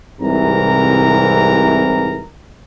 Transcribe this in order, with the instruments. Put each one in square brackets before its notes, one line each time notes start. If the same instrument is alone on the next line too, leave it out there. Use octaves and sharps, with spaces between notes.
[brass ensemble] C2 G#2 C3 E3 A#4 A#5